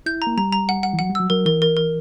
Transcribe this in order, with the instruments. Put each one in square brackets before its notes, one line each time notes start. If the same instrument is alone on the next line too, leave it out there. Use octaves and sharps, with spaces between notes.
[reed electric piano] E4 [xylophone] G6
[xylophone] A#5
[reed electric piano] A#3
[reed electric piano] G3 [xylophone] A#5
[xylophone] A#5
F#5
F#5
[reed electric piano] E3
[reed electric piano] F#3 [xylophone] F#5
[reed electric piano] G3
[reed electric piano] F#3 [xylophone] E6
[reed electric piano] F#3 [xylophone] A#4
[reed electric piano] E3 [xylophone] A#4
[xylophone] A#4
A#4